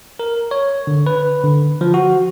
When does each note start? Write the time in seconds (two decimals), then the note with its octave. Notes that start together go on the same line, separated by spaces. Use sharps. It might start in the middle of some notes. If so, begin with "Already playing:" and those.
0.20 A#4
0.51 C#5
0.87 D3
1.07 B4
1.43 D3
1.81 F3
1.94 F#4